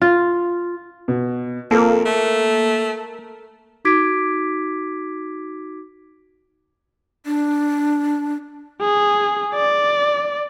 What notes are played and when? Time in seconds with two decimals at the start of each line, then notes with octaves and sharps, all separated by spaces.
0.02 F4
1.08 B2
1.71 F2 A#3 A4 A#4
2.05 A3
3.85 D#4 F#4 D6 G#6 B6 D7
7.26 D4
8.81 G#4
9.54 D5